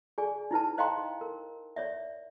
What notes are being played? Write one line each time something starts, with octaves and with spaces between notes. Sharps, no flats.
G#4 D5 G#5
D#4 E4 B4 A5
C5 D#5 F5 G5 A#5 C6
A#4
C#5 D5 E5